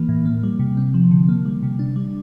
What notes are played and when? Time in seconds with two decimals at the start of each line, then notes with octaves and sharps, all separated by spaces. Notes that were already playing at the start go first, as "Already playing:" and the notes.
Already playing: E3 A#3
0.09 A2
0.25 A#3
0.43 G3
0.59 C3
0.77 C4
0.94 F3
1.11 D3
1.29 A#3
1.46 G3
1.63 C3
1.79 D4
1.96 G3